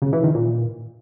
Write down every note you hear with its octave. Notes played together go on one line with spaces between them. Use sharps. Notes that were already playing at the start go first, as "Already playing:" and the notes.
C#3
E3
D#3
A#2